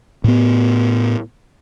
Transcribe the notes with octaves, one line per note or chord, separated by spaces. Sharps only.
A2 B3